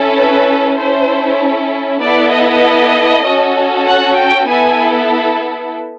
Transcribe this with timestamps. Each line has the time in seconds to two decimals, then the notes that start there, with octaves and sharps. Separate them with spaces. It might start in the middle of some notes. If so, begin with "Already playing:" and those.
Already playing: C#4 E4 A4
0.15 B4
0.77 C#4 E4 A4 C5
2.00 B3 E4 A4 D5
2.31 D#5
3.24 C#4 F#4 A4
3.85 F#5
4.16 G5
4.47 B3 E4 A4 G#5